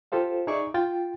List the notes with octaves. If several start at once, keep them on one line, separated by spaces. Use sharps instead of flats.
F4 G4 A4 C5 F5
D#4 G#4 D5 E5 C#6 D6
F4 G5 A6